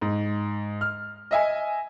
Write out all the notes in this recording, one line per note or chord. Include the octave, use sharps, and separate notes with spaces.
G#2
F6
D#5 E5 G#5